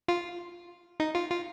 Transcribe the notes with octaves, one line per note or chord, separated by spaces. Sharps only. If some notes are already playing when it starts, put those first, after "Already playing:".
F4
D#4
F4
F4